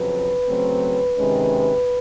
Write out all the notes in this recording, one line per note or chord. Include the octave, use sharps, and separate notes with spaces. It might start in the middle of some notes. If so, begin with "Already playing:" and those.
Already playing: F2 C#3 F#3 B4
C#3 F#3 A3 C4
C3 D#3 G#3 C#4